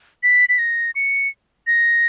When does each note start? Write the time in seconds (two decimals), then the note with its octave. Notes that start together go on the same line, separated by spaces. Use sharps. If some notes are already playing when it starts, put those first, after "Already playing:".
0.23 B6
0.49 B6
0.58 A#6
0.95 C#7
1.67 A#6